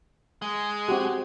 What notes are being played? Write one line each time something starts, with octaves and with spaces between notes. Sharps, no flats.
G#3
C4 F#4 G4